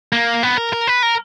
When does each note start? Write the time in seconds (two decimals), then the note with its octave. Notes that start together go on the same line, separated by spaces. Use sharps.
0.13 A#3
0.43 B3
0.57 A#4
0.73 A#4
0.87 B4
1.03 A#4